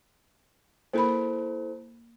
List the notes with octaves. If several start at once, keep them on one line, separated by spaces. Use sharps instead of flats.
A#3 E4 A4 A#4 C5 B5